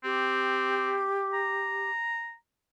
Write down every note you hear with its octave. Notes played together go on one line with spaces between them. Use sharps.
C4 G4
A#5